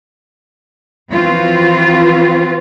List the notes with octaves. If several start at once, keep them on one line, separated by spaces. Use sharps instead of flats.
E3 F3 C4 F4 F#4 B4